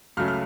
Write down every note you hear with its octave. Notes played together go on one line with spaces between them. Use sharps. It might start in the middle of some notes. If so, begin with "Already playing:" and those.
C#2 C#3 F#3 A3 F6
F6